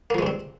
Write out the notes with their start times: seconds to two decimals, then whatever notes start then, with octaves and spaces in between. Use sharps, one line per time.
0.10 A#3
0.14 F3
0.18 G#3
0.22 G2
0.26 C4